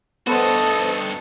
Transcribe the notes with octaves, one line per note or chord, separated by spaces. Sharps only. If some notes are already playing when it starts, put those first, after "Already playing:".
G2 B3 F#4 A4 B4 C5 D#5